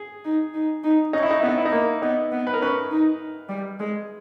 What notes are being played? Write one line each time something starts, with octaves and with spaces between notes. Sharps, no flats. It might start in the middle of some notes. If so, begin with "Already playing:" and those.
Already playing: G#4
D#4
D#4
D#4
C#4 D#4
E4
D#4
B3 E4
D#4
E4
D#4
A#3
B3 D#4
B3
B4
A#4
C#4 B4
D#4
G3
G#3